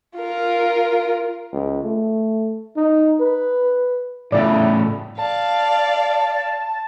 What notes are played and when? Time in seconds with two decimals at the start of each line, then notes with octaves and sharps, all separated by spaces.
0.16 F4 A#4
1.53 C#2
1.84 A3
2.76 D#4
3.20 B4
4.32 A2 C#3 E4 D5
5.19 D5 F5 A5